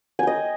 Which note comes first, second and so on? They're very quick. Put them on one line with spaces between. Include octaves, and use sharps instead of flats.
G#5 G5 D#5